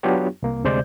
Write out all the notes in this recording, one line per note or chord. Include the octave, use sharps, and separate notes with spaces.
F#3 B3 D4 F4 G4 C#5
C2 A#3
D2 C3 G#3 C5 D5 G6